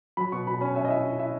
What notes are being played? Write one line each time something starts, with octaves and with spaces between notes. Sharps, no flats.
F#3 B5
B2 C#6
B2 B5
C#4 B5
C#4 E5
D#5
E4 E5
E4
E4 E5